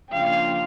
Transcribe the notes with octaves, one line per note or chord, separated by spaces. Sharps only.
C#3 F3 A#3 D4 F4 F5 G5